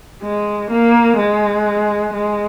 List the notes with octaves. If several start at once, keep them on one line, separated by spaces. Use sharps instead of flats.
G#3
A#3
G#3
G#3